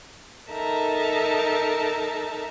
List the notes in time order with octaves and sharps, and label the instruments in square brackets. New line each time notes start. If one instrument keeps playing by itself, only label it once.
[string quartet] D#4 A4 A#4 E5 A5 A#5